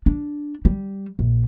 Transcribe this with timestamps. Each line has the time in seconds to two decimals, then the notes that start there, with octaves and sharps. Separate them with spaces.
0.06 D4
0.65 G3
1.19 A#1